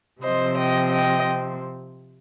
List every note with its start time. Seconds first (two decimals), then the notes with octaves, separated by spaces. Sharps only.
0.22 C3 F3 C4 C5 D#5
0.57 D#5 G5
0.91 D#5 G5